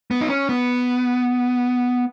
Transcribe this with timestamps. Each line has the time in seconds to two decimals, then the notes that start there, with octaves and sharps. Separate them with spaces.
0.11 B3
0.21 D#4
0.30 C#4
0.49 B3